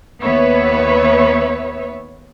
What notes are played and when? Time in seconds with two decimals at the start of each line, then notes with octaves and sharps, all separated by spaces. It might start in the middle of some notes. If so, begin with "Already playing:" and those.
0.22 D#2 B3 B4 C#5 E5